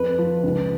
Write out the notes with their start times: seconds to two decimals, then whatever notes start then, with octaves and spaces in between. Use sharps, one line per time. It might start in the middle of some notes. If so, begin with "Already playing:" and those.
Already playing: F2 B4
0.19 F3
0.43 C#2